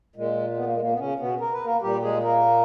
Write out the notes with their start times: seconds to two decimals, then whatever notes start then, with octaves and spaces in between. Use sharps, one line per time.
0.16 A#2 G#3
0.57 B3
0.66 A#3
0.73 G#3
0.80 A#2 A#3
0.93 B3
0.99 C#3 C#4
1.20 B2 B3
1.41 A#4
1.53 B4
1.65 A#3 A#4
1.82 A#2 G3 G4
2.03 G#3 G#4
2.24 A#3 A#4